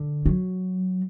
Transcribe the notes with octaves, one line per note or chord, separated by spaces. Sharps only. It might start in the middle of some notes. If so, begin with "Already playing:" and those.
Already playing: D3
F#3